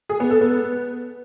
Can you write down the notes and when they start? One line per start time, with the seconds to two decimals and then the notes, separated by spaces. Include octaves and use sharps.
0.09 G#4
0.20 B3
0.31 A4
0.41 B3